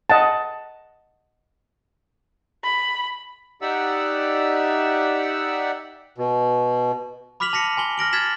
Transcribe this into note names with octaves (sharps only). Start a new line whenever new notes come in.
D#5 F#5 A5
B5
D#4 G4 D5 E5 F#5 E6
B2
B5 D6 F6 B6 F7 F#7
A5 A#6 B6 C#7
G#5 C6 G7
F6 A#6 D7 F#7
F6 G#6 A6 B6 E7 F#7